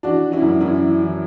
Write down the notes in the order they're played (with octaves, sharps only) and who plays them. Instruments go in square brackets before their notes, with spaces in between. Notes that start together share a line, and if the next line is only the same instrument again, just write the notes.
[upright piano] E3 D4 F#4
E3
C#4 E4
F#2
F#2 C#4 E4
E3
E3